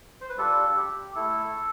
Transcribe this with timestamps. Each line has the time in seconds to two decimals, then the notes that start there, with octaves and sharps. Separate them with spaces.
0.21 C5
0.29 B4
0.38 G3 D4 F4 A4
0.76 G4
1.15 A3 E4 A4